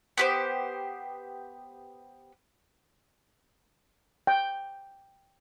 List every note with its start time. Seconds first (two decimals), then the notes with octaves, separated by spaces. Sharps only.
0.18 B3 G4 C5
4.27 G5